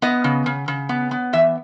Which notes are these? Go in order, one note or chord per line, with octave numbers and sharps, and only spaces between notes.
B3 D#5
C#3
C#3
C#3
B3
B3
E3 E5